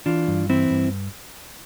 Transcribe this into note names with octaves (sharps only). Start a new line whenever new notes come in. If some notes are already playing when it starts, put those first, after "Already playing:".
E3 D4 F4
G2
E3 C4 E4
G2